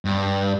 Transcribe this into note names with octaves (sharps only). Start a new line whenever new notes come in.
G2